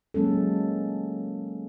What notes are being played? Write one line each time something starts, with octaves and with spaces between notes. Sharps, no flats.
F#3 G#3 A#3 C#4 A4